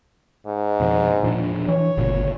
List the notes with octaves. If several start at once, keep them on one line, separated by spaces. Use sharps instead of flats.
G#2
F2 B2 F3
E1 A#2 F3 D4
E3 C#5
G1 D2 A#2 C#3